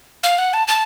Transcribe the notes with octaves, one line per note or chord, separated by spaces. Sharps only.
F5
F#5
A5
A5